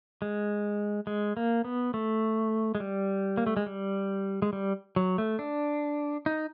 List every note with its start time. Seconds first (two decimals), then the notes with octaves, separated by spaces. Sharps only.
0.22 G#3
1.07 G#3
1.37 A#3
1.64 B3
1.94 A3
2.75 G#3
2.80 G3
3.37 A#3
3.47 A3
3.57 G#3
3.66 G3
4.42 G#3
4.53 G3
4.96 F#3
5.18 A3
5.39 D4
6.26 D#4